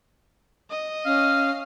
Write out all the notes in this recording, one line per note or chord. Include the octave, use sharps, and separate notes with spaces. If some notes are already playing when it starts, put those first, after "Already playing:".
D#5
C#4 F5